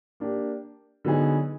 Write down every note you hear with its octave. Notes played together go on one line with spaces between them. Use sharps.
A#3 D4 G4
D3 F#3 B3 D#4 G#4